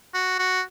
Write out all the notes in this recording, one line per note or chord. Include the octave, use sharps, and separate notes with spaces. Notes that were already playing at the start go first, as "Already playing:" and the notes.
F#4
F#4